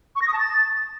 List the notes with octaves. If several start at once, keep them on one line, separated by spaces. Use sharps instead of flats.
C#6
A#6
D#6
A5
A6